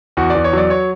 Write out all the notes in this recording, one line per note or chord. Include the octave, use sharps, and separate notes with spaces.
E2 F#4
E2 D5
C#5
F#3 D5
C#5